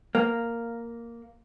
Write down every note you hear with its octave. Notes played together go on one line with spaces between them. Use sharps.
A#3